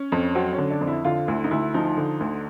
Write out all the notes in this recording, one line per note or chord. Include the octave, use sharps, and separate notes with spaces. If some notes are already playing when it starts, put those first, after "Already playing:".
Already playing: C#4
F2
F#3 C4
C#4
D3
D4
F2
E4
D3 F4
D2 E4
D#4
D2 E4
F3 D#4
D3
D2